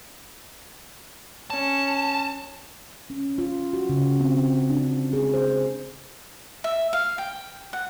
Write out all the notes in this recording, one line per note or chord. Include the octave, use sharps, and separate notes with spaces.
C#4 A5
C#4
F4
F#4
C#3
C4
D4
G#4
C5
E5
F5
G5
F#5